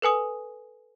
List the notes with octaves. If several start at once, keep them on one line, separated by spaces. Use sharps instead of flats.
A4 B4 G#5 D#6